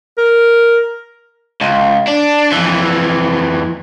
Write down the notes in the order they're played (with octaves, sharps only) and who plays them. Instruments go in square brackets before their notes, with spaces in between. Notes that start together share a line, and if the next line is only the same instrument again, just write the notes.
[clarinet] A#4
[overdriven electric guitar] C#2
D4
F2 E3